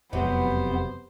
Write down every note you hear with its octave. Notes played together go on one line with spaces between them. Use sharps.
E1 F2 C3 E3 F#3 G#3 B3 C5